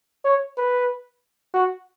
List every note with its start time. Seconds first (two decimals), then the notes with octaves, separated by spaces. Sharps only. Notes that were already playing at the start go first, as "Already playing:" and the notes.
0.25 C#5
0.57 B4
1.54 F#4